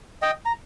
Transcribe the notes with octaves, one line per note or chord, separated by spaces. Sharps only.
D#5 G5
A#5